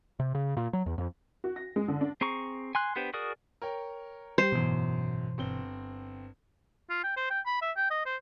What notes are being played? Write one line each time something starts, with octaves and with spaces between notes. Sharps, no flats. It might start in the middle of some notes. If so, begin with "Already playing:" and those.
C3
C#3
A#2
F#3
E2
F2
F#4
A#6
G#3
D3
D4
C4 G#4 A#5 C#6
G#5 C6 F#6
B3 D4 G4 B4 C5
F#4 G#4 A#4 D5 D#6
A#4 C#5 G5
G3 G4 C5
G#1 F#2 B2 E3
G1 C4 G7
F4
G5
C5
G5
B5
E5
G5
D#5
C5